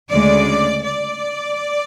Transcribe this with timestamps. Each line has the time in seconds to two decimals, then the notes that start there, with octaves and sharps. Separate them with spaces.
0.10 D2 C#3 G#3 D5
0.85 D5